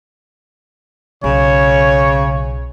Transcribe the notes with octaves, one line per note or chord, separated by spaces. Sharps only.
B1 C#3 C#5